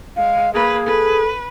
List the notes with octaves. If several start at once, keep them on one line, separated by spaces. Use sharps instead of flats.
G#3 F5
A#3 G#4 B4
A4 B4